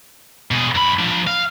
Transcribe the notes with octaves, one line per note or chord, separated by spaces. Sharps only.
B2 G#4
F#2 B5
F3 D4
F5